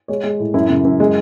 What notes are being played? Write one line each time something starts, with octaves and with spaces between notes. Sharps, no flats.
G#3 C#5
G#3
A2
F#2 E4
C#3
F#2
G#3